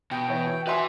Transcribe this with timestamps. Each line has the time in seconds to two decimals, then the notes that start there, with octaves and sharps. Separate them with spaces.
0.11 B2 G5
0.28 E3 E4 C#5
0.67 F#4 B4 D#5 E5 G#5 C6